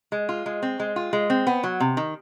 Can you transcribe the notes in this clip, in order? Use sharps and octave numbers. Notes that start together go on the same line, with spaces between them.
G#3
F4
G#3
C4
G#3
F4
G#3
C4
B3
F#3
C3
D#3